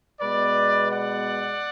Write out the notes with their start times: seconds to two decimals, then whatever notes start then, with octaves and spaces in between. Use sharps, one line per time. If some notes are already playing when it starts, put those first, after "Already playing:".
0.20 B2 G#3 B3 B4 D5
0.91 D5 F#5